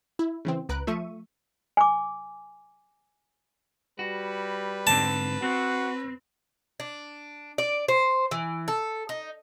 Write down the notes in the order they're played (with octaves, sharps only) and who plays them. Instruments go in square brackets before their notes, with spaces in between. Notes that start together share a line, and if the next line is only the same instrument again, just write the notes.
[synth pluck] E4
C#3 E3 C4
C#2 B4 A#5 F#6 D7
F3 A3 E5 C#6 D#7
[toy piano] G#5 D6
[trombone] G3 [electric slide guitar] F#4 [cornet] B4
[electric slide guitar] G#2 D3 C4 [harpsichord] A5
[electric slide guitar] C4 [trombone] F#4
[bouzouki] D4
D5
C5
E3
A4
D#4